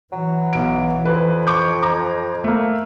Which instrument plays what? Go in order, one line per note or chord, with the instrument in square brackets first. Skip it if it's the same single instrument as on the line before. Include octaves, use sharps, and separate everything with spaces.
[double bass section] E3 [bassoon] F#3
[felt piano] B1 D7
[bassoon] F2 [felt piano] B4
[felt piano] C#6 D6 G6
A#5 D6
A3 A#3